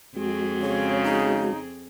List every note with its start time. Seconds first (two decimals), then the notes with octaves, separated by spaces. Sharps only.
0.17 F2 G#3 C4 F#4 G#4
0.62 C#3 C#5
1.03 D#4